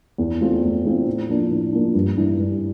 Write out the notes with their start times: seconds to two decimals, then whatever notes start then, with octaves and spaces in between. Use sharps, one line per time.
0.18 E2
0.41 E3 A3 C4 F4
0.63 E2
0.85 E3 A3 C4 F4
1.06 A2
1.29 F3 A#3 D4
1.51 A2
1.72 F3 A#3 D4
1.94 G2
2.17 E3 G3 D4
2.38 G2